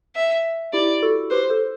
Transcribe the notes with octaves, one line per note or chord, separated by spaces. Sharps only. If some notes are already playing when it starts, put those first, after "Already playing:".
E5
E4 G4 D5
F#4 A4
G4 B4 C5
A4 C5